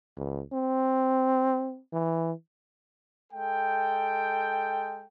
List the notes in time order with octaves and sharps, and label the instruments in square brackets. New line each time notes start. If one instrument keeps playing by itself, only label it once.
[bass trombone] C#2
C4
E3
[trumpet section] G#3 A4 G5